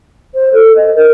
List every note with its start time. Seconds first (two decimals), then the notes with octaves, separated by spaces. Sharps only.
0.34 C5
0.53 A4
0.75 D#5
0.95 A#4